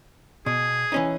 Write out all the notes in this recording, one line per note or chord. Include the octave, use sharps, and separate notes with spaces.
B2 G#4
E3 C#4 D#4